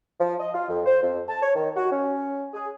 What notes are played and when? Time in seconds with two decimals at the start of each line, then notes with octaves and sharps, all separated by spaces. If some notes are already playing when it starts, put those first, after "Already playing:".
0.20 F3
0.40 D#5
0.54 F4
0.69 F2
0.86 C5
1.02 F2
1.28 A5
1.42 C#5
1.55 D#3
1.76 F#4
1.91 C#4
2.54 G#4